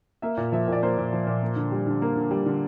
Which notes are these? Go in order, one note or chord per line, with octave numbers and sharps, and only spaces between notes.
A#3 E5
A#2
F3 E5
A#2 D5
A#3 C5
A#2
F3
A#2
A#3
D3
G3
D3
A#3
D3
G3
D3